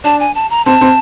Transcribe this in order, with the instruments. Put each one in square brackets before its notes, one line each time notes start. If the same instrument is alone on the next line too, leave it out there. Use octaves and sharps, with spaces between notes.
[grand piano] D4 [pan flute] A5
[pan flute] G#5
A5
A#5
[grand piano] C4 [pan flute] A5
[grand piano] C4